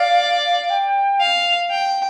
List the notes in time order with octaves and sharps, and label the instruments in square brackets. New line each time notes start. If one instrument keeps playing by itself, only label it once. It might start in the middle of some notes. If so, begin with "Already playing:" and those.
Already playing: [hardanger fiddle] D5 [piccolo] F5
[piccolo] G5
[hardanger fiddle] F5
G5